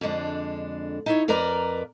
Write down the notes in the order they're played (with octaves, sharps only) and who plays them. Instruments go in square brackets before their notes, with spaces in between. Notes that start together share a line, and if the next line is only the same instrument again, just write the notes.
[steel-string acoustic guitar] F2 D3 G#3 D4
D#4 E4 C#5
F2 A#4 B4 D5 A#5